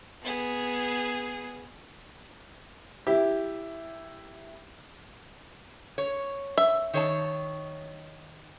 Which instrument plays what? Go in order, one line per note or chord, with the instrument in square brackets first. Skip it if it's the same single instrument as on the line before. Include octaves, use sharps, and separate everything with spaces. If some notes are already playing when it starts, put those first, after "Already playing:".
[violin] B3 G#4
[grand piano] E4 [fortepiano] G4
[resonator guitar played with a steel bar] C#5
[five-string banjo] E5
[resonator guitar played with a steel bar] D#3 C#5 A5